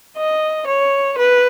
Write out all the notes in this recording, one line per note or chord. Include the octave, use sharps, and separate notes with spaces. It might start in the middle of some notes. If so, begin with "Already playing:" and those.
D#5
C#5
B4